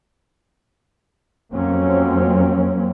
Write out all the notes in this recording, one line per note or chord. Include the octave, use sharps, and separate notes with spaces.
F2 F#3 A#3 C4 C#4